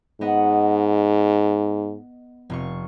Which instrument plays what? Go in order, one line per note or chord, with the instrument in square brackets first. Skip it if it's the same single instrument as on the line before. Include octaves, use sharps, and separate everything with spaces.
[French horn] G#2 [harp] B3 D#5 F#5
[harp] F1 F4 C#6